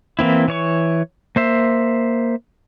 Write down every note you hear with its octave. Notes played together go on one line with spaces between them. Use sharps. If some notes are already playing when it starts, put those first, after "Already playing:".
E3 A#3 C4 E4
E3 C#5 C#6
A#3 C5 E5